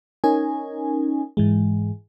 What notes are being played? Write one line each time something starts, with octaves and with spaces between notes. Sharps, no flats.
C#4 D#4 A#4 G#5
G#2 E3 G#3